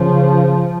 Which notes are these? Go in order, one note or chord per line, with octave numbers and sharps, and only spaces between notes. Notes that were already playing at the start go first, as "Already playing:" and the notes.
Already playing: C#3 F3 C#4